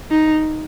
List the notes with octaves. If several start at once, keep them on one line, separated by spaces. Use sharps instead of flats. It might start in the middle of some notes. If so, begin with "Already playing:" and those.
D#4